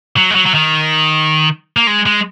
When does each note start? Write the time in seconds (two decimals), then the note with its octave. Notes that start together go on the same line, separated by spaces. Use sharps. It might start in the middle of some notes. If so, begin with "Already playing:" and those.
0.17 F#3
0.30 G#3
0.35 F#3
0.46 F#3
0.55 D#3
1.77 A#3
1.87 G#3
2.06 G#3